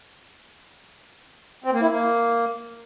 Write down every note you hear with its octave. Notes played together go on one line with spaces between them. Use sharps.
C4
A#3
E4
A#3